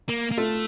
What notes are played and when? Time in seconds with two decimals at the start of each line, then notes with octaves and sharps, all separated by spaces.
0.09 A#3
0.31 A#3
0.38 A3 F4 A4